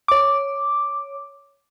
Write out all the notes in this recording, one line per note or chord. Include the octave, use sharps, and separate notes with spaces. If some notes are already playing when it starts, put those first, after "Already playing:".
C#5 D6